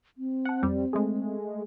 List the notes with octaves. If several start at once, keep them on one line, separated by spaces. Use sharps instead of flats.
C4
F#5 A5
F2 G3
G#3 A3 G#4